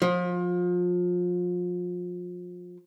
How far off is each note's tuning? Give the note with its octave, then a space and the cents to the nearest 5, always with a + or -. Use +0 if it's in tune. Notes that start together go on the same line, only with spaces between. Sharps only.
F3 +30